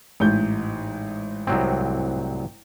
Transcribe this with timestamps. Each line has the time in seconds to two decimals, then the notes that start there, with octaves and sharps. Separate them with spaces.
0.20 A1 G#2 G6
1.47 C2 F#3 C4